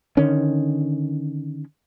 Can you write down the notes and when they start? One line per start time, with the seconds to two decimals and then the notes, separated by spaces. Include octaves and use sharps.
0.17 D3 D#3 C#4